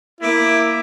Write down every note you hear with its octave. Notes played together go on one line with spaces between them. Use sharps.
A#3 E4 D6